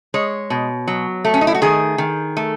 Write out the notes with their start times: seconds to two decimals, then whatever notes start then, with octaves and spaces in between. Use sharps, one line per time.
0.14 G#3 C#5
0.50 B2
0.88 F#3
1.25 A3
1.34 C#4
1.41 D#4
1.47 E4
1.55 F#4
1.62 D#3 G#4
1.98 D#3
2.37 A3